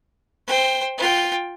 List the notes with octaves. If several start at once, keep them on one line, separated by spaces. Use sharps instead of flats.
C5 G5
F4 G5